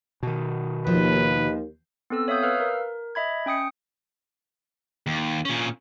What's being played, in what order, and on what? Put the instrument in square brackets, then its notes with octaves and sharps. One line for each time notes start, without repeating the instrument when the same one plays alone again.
[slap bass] B2 D#3
[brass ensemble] D#2 [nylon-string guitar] F3 [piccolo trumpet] B4
[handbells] B3 C4 A4 E6
C#5 E5 F5 D#6 G6
B4 F5 E6 F6
A#4
D#5 E5 B5 G#6
C#4 G5 D#6 C#7
[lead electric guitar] D#2
A#2 C#4